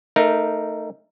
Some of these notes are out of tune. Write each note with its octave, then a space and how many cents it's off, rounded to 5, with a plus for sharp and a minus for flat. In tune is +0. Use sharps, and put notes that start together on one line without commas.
A3 +20 D#4 +0 A#4 +0